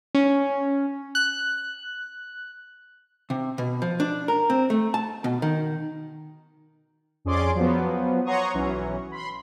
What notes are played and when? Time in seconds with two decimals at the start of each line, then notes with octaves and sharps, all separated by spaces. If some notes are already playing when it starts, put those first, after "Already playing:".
0.15 C#4
1.15 F#6
3.30 C3
3.58 B2
3.82 F3
4.00 D4
4.28 A#4
4.50 C4
4.70 A3
4.94 A5
5.24 B2
5.42 D#3
7.25 F2 C#4 G#4 D5 C6 D6
7.55 F3 F#3 B3
8.25 C#5 F#5 A#5 C6 C#6 D#6
8.54 B1 E3 F#3 C#4
9.12 B5 C6